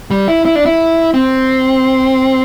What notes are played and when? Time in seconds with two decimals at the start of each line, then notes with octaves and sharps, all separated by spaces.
0.11 G3
0.28 E4
0.46 E4
0.56 D4
0.66 E4
1.14 C4